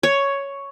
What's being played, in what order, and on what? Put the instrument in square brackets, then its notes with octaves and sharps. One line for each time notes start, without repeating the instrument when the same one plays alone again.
[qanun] C#5